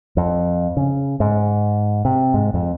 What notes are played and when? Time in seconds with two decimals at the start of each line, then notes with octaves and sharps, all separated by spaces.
0.17 F2
0.77 C#3
1.20 G#2
2.05 C3
2.34 G#2
2.54 F2